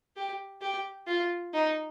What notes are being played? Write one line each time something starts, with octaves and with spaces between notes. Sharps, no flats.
G4
G4
F4
D#4